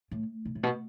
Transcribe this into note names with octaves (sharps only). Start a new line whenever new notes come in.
A2
B2
A2
B2